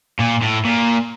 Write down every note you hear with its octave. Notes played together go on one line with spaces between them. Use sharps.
A#2
A2
A#2